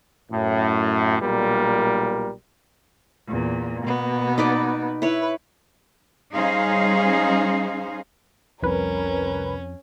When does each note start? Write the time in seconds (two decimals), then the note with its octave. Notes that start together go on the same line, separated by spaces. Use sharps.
0.32 F#2 A2
1.21 B1 A#2 G3 A#4
3.27 E2 A#2
3.82 B2 A#3 B3
4.38 D#4 B4 D5
5.02 E4 B4 C#5
6.34 G3 C#4 D#4 G#4 C5 F5
8.62 C2 F2 C#4 A#4 B4